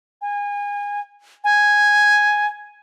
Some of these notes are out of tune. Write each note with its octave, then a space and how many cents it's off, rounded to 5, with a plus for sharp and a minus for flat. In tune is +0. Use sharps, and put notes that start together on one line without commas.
G#5 -25
G#5 +0